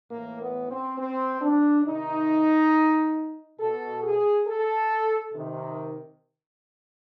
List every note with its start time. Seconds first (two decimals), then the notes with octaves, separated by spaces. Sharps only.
0.10 A2 E3 A#3
0.40 B3
0.69 C4
0.98 C4
1.41 D4
1.85 C3 D#3 D#4
3.60 B2 A4
4.03 G#4
4.47 A4
5.34 C3 D#3